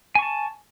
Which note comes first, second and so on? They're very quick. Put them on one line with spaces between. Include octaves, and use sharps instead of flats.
G#5 C#6 A5